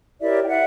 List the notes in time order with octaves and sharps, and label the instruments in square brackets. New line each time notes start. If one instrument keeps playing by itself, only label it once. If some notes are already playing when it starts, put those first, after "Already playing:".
[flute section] E4 G4 A#4 C#5 D5 E5
G5
E5 F#5